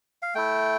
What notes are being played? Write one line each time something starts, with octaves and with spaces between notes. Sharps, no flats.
F5
A3 E4 G5